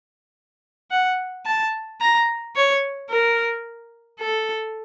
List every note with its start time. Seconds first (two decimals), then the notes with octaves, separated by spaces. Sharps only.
0.91 F#5
1.46 A5
2.01 A#5
2.56 C#5
3.10 A#4
4.20 A4